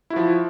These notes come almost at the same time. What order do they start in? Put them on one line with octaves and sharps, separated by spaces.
E4 F#4 F3